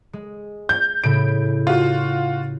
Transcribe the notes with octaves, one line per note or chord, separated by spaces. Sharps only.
G#3
G6
A2 C#3 E4 D7
F4 F#4 D#7